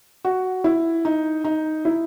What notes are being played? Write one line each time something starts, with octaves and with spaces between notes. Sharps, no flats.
F#4
E4
D#4
D#4
E4